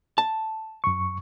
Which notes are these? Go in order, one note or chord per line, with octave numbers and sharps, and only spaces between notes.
A5
F#2 C#6